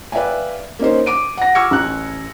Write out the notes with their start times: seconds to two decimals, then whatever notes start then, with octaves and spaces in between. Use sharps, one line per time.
0.12 B4 D5 E5 F5 G5 G#5
0.79 A#3 C#4 D#4 C5
1.06 D6 D7 D#7
1.37 F#5 A#6
1.55 C#6 D6 E6 F6 G#6 C#7
1.71 A1 A#5 F#6